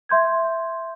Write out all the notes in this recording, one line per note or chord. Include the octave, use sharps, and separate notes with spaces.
E5 C6 G6 G#6